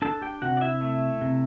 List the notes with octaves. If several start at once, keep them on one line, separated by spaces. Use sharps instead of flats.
D4 A4 A5
G4 G5
C3 F#4 F#5
D5
E4 E5
A3
C3